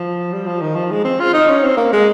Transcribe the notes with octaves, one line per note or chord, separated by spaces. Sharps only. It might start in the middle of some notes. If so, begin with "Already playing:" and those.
Already playing: F3
G3
F3
D#3
F3
G#3
C4
F4
D#4
C#4
C4
A#3
G#3